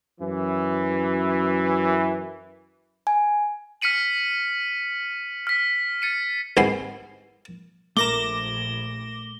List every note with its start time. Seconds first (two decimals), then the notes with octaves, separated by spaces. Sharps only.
0.21 F#2 E3
3.07 G#5
3.82 F6 B6 C#7 D#7 F#7
5.47 F6 B6
6.02 A6 C#7 D#7
6.57 C2 G#2 B3 G#5 C6
7.97 A#1 A3 A#4 A#5 D6 A#6 E7 G7